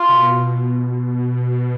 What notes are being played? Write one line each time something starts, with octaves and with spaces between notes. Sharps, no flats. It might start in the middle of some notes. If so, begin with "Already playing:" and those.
Already playing: F4
C3
B2